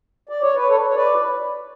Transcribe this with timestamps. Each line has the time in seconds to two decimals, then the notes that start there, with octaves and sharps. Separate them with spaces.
0.29 D5
0.42 C#5
0.55 B4
0.68 A4 C#5
0.88 C#5
0.94 B4 D5